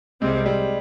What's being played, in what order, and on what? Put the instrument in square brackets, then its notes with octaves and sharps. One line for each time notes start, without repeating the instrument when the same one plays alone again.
[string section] C2 C3 G3 C4 [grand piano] G#3
[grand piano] G3